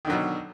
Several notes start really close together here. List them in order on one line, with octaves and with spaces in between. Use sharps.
D#3 D3 F#3 B2